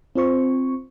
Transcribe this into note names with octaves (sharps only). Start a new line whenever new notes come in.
C4 F4 C5 C#6